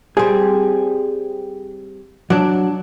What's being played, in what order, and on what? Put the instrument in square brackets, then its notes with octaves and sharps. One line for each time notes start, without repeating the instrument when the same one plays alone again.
[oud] G3 C4 [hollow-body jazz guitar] G#4
[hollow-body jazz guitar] F#3 [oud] D4